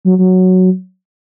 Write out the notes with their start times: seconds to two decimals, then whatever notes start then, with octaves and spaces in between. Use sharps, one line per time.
0.05 F#3
0.19 F#3